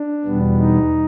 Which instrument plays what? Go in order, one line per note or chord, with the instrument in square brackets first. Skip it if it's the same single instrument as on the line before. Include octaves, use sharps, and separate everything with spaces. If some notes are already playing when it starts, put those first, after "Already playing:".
Already playing: [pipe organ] D4
E2 B2 G3 B3
D#4